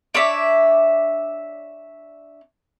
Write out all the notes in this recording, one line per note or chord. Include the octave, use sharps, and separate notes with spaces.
D4 C#5 D5 E5